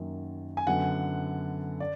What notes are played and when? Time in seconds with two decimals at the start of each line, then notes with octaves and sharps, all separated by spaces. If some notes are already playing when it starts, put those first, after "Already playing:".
Already playing: F#2 D#3 F#3 A#3
0.57 G#5
0.67 F#2 D3 F#3 B3 F#5
1.80 D5